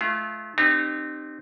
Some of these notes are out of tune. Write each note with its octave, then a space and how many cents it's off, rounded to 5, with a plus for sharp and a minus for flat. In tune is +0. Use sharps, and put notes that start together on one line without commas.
A3 -35 F4 -30
C4 +0 D#4 -35 G4 +5